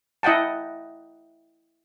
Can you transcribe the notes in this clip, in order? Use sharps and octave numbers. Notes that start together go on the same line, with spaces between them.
E4 D#5 F#5 G5 A5